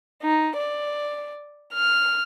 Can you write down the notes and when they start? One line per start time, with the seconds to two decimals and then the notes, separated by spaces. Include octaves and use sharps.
0.23 D#4
0.58 D5
1.74 F6